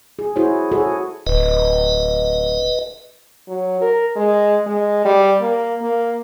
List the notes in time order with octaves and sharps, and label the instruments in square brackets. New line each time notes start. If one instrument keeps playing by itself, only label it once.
[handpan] G#4
E4 F#4 G#4 C5 C#5
F#4 G#4 A4 C#5
[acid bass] D1 [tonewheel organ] B4 D#5
[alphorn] F#3
A#4
G#3
G#3
G3
A#3
A#3